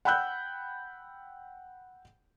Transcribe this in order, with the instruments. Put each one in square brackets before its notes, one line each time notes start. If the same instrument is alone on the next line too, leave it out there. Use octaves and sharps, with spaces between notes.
[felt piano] F#5 G5 B5 E6 F#6 G6